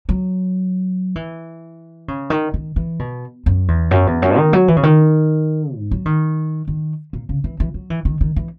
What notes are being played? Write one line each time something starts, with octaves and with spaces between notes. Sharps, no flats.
F#3
E3
C#3
D#3
D#3
E3
B2
F#2
E2
F#2
E2
F#2
D#3
F#3
E3
C#3
D#3
G#2
F#3
D#3
D#3
A#2
C#3
E3
E3
F#3
E3
D#3
D#3
E3